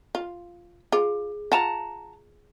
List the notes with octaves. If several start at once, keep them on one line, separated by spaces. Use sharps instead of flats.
F4
F4 G#4
F4 F#5 A5 A#5